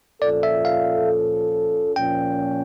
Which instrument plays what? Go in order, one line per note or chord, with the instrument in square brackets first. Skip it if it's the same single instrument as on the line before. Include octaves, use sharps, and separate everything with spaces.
[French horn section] A#2 F3 C#4 F4 A4 [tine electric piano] D5
[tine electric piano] E5
F5
[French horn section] A#2 F3 C#4 [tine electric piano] G5